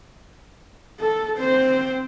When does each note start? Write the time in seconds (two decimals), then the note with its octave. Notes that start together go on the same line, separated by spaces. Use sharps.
1.00 A4
1.38 C4 C5